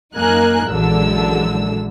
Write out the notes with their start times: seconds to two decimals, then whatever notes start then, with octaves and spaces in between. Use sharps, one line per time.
0.15 F#2 A#3 D#4 A#4 G#5 F#6
0.70 A#1 F#2 D3 E3 G#3 E6